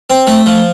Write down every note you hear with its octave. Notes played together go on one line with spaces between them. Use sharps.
C4
A3
F3